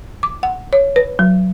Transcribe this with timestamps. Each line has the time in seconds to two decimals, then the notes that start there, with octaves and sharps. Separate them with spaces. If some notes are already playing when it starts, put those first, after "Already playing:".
0.23 D6
0.43 F#5
0.73 C#5
0.96 B4
1.19 F#3